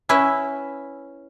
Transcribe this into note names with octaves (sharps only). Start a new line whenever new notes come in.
C#4 E4 B4 E5